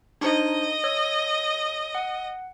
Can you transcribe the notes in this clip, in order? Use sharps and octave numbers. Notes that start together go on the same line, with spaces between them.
D4 D#4 C5 D#5
C#5 E6
F#5